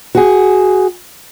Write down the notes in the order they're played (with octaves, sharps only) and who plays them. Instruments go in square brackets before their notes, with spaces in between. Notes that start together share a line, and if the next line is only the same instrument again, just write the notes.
[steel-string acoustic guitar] F#4 G#4